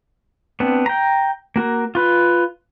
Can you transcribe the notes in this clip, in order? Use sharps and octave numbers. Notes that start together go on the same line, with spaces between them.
B3 C4 D4
G5 A#5
A#3 F#4 A#4
F4 B4